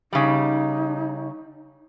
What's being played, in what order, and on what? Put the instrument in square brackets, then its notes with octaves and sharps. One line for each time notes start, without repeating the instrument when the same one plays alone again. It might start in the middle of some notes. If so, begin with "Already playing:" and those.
[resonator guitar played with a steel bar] C#3 G3 [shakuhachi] D#4